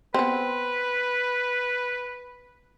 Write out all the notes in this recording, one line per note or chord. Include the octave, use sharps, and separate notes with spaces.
B3 C4 B4